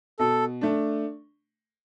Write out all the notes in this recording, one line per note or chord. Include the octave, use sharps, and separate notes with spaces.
B2 A4
A3 D4